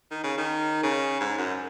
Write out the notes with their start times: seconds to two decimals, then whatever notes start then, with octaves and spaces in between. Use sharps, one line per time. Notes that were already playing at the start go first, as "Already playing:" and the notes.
0.11 D#3
0.24 C#3
0.38 D#3
0.83 C#3
1.21 G#2
1.38 F#2